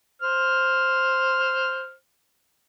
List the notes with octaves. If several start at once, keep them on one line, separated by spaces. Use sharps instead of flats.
C5 F6